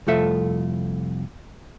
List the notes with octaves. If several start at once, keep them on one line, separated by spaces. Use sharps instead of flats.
C2 F2 A3 F4 A4 E5